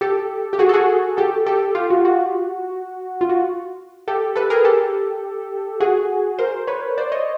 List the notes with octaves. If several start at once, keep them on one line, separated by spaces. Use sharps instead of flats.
G4 A4
G4
F#4 G#4
A4
F#4 G#4
G4 A4
G4 A4
F4 G4
F#4
F#4
F4
F#4
G4 A4
A4 B4
G#4 A#4
G4 A4
F#4 G#4
A#4 C5
B4 C#5
C5 D5
C#5 D#5